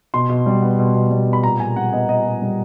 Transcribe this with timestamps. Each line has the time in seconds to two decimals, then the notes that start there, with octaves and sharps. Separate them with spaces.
0.14 B2 C6
0.29 B2
0.46 G3
0.62 B3
0.79 B2
0.95 B2
1.11 G3
1.27 B3
1.33 B5
1.44 A#2 A#5
1.60 A#2 G#5
1.76 G3 F#5
1.93 B3 D#5
2.09 A#2 D#5
2.25 A#2
2.42 G3